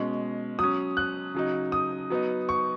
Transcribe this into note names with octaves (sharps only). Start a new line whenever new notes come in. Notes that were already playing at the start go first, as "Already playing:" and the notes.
Already playing: B2 G#3 C#4
F#3 C#4 D#6
F#6
C#3 F#3 D#4
D#6
F#3 B3 D#4
C#6